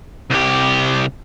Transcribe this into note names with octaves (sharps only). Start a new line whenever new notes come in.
C2 G4